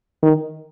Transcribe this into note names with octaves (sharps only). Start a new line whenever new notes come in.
D#3